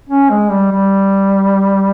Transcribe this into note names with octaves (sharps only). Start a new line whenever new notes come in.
C#4
G#3
G3
G3